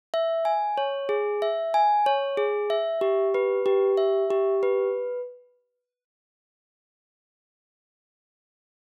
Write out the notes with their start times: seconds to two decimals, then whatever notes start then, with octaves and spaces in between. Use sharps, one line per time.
0.14 E5
0.45 G#5
0.78 C#5
1.09 G#4
1.42 E5
1.74 G#5
2.06 C#5
2.37 G#4
2.70 E5
3.01 G4
3.34 B4
3.66 G4
3.97 E5
4.30 G4
4.63 B4